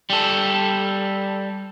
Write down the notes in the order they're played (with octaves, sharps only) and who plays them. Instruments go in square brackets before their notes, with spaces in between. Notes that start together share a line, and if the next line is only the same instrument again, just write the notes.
[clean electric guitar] G3 A4